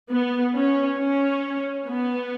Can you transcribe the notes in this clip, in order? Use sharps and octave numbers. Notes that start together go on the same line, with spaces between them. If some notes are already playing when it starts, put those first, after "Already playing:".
B3
C#4
C#4
B3